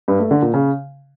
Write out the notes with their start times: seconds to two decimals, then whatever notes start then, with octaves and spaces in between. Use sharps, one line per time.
0.08 G2
0.19 A3
0.31 D3
0.42 A#2
0.54 C#3